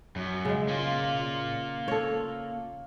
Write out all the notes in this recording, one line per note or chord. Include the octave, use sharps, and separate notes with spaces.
F#2
C#3 G#3
A#3 F4
A4 C#5